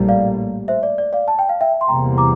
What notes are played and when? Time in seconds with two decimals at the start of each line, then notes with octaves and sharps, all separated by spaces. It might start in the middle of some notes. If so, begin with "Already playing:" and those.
Already playing: A#1 A2 G3 A#3
0.09 D5 F5
0.68 C5 E5
0.83 D5
0.98 D5
1.13 D5 F5
1.28 A5
1.39 G5
1.49 F5
1.61 E5 G5
1.81 C6
1.88 E2 C3 G3 A#3 G5 A#5
2.18 A#5 D6